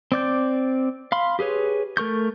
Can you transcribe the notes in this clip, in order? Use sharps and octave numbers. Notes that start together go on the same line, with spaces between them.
C4 D5 G6
F5 B5 C6
G4 G#4 B4 C#5
A3 A#4 C#6 G6